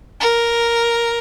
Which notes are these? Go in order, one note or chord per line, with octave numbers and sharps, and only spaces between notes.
A#4